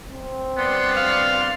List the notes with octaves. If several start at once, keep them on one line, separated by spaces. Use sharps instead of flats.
C4
G2 B3 D5 C6
F5